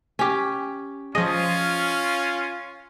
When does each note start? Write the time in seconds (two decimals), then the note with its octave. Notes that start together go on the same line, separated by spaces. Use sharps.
0.19 C#4 G4 B6
1.15 F3 C#4 F4 G#4 D#5